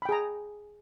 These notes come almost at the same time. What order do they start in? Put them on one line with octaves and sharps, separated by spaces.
B5 G5 G#4 A#5